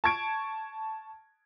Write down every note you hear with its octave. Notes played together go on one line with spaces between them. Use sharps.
A5 C#6 G#6 D7